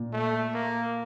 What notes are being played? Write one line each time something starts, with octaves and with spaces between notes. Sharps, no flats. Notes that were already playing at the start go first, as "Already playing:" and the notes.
Already playing: A#2
A3
A#3